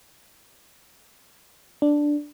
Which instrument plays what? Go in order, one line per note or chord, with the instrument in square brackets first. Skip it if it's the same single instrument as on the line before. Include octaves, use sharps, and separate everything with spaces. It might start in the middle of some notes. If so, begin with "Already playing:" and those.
[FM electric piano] D4